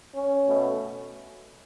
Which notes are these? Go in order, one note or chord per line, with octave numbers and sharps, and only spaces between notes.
C#4
B2 A3